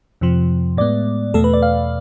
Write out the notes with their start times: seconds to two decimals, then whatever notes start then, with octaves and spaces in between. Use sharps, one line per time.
0.21 F2 C3 F3
0.77 A2 G#3 B3 D5
1.34 E2 B2 A3 A4
1.44 B4
1.54 D5
1.63 F5